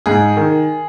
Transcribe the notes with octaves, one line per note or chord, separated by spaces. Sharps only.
G#2 G#4
D#3